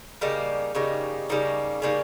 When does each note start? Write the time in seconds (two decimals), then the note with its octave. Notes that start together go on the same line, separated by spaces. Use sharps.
0.21 C#3 G3 A#3 D#4
0.75 C#3 G3 A#3 D#4
1.29 C#3 G3 A#3 D#4
1.82 C#3 G3 A#3 D#4